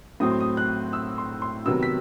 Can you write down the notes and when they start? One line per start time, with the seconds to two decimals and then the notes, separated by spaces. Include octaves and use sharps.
0.20 A2 F#3 C4 D#6
0.31 C6
0.40 D#6
0.57 F#6
0.93 E6
1.18 C6
1.42 C6
1.66 C3 D#3 F#3 B3 E6
1.83 B6